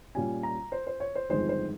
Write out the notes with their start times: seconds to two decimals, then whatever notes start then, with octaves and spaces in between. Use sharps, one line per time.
0.15 A#2 G3 C#4 G#5
0.43 A#5
0.72 C5
0.87 C5
1.00 C#5
1.15 C5
1.30 G1 F2 D#3 G#3 C5
1.49 C5